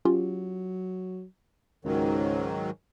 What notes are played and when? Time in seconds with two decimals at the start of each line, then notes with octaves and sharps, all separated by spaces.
0.05 F#3 C#4 F4 G4
1.85 C#2 G#2 D#3 F#3